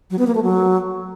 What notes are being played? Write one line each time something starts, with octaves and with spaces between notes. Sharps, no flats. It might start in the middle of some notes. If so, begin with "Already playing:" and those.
F#3
B3
A#3
A3
F#3